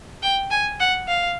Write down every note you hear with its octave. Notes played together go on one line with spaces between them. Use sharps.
G5
G#5
F#5
F5